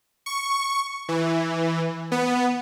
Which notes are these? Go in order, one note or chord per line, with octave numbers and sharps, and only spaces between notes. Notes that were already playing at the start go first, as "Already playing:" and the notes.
C#6
E3
B3